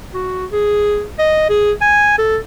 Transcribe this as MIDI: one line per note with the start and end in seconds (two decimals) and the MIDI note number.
0.14 0.46 66
0.52 1.05 68
1.19 1.47 75
1.49 1.72 68
1.81 2.18 80
2.18 2.38 69